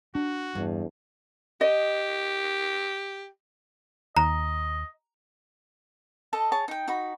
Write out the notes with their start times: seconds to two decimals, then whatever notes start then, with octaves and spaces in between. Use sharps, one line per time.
0.15 D4 F#4
0.55 E2 G2
1.61 G4 D#5
4.17 D#2 D#5 A#5
6.33 A4 D#5 A5
6.52 G#4 C#5 A5
6.68 D#4 G5
6.88 D#4 F#4 B5